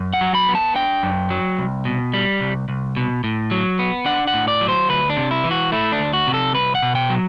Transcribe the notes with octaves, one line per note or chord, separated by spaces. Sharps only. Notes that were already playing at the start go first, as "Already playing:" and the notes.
Already playing: F#2
F#5
F#3
B5
B3
A5
D4 G5
F#2
F#3
C2
B2
G3
C2
C2
B2
A2
F#3
B3
D4 F#5
F#5
A2
D5
F#3
C5
D2 B4
D4
C3
E4
E3
F#4
A3 E4
D4
D2
F#4
C3
A4
C2 B4
F#5
B2
G5
F#3